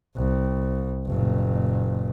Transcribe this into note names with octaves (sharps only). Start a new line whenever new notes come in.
C2
F#1 A#2